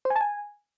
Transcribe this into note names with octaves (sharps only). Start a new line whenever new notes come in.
C5
G#5
A5
G#5